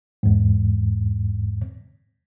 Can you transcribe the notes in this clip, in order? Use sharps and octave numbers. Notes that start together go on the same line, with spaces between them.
E2 G#2